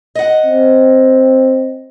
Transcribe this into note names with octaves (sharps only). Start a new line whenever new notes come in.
D#5 F#5
C4